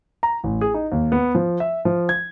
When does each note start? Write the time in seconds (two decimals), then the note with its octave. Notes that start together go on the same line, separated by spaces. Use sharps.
0.23 A#5
0.44 A1
0.61 G#4
0.74 D#4
0.92 D#2
1.12 B3
1.35 F3
1.60 E5
1.85 F3
2.09 G#6